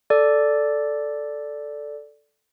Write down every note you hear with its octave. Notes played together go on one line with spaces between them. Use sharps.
A4 D5